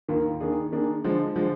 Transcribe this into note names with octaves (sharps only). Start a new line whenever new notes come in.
D#2 D#3 A#3 F4
D#3 A#3 D4 G#4
D#3 A#3 D4 G#4
D3 F3 G#3
D3 F3 G#3